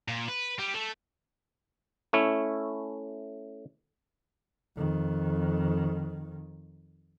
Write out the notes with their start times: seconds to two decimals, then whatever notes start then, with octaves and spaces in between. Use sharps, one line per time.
0.08 A#2
0.28 B4
0.59 G3
0.74 A3
2.13 A3 C#4 E4
4.76 F2 D#3